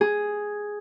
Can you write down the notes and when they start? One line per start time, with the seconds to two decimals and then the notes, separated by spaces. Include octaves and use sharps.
0.01 G#4